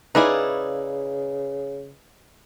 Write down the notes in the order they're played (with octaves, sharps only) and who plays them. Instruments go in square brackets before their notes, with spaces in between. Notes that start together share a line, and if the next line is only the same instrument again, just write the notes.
[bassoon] C#3 [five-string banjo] D#4 E4 G#4 [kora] B4 D5 F5